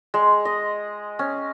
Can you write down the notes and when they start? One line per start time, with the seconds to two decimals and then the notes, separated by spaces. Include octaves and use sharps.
0.14 G#3
0.45 D#5
1.19 C#4